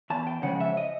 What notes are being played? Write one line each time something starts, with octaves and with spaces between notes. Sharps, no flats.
E2 A5
G5
C#3 F3 G#3 F#5
E5
D#5